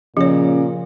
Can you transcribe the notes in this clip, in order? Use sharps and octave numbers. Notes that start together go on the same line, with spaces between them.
A#2 C#3 F3 C#5